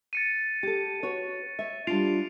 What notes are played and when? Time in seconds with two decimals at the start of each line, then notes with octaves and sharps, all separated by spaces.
0.13 A6 C#7 D#7
0.63 G4 A4
1.03 F#4 B4 C#5
1.59 C#5 E5
1.87 G3 D4 F4 C7 D7 F7